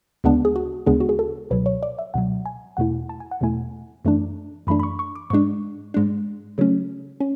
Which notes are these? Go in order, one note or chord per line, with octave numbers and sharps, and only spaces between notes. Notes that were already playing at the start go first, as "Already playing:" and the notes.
D2 C#3 G#3 B3 D4
G#4
F#4
D2 C#3 G#3 B3 D4 G#4
F#4
G#4
A4
C#2 B2 F#3 B4
C#5
D5
E5
C#2 B2 F#3 F#5
G#5
E2 B2 A3 E4 F#5
A5
G#5
F#5
E2 B2 A3 E4 G#5
F#2 E3 A3 D4
F#2 E3 A3 D4 B5
B5
C#6
C#6
D6
G#2 G#3 D4 C#6
G#2 G#3 D4
C#3 F#3 A3 C#4
C#4